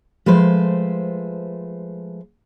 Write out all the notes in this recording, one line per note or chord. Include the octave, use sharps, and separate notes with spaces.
F3 G#3 A3 B4 C5